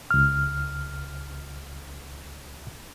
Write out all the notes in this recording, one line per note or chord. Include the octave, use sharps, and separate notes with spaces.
C#2 F6